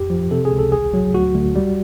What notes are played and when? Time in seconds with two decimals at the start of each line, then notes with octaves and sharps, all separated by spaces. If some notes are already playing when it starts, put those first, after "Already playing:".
Already playing: F2 G4
0.10 F3
0.31 C3 A4
0.45 G#4
0.52 C#2
0.58 A4
0.72 A1 G#4
0.94 F#3
1.14 D2 F#4
1.34 D2
1.55 G3